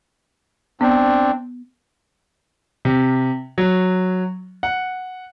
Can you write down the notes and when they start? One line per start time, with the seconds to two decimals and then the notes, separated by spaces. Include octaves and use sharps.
0.81 B3 C4 D4
2.85 C3
3.58 F#3
4.63 F#5